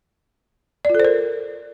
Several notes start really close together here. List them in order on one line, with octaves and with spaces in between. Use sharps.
D5 F4 A4 C5 A#4